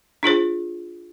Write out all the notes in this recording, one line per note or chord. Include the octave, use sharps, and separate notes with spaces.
D4 F4 G#4 C5